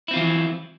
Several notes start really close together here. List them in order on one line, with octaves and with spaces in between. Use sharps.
E4 C4 F4 E3 F#3